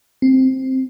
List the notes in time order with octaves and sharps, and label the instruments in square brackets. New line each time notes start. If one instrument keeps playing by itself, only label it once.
[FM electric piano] C4